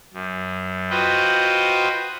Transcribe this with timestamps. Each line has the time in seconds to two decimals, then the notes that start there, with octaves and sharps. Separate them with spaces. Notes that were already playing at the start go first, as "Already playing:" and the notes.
0.14 F#2
0.90 F4 F#4 B4 C5 D#5 G5